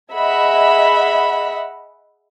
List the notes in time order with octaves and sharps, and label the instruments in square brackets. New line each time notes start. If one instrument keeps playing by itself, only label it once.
[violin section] G#4 D#5 E5 F#5 B5